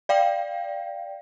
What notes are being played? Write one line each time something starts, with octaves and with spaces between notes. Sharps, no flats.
D5 F5 G5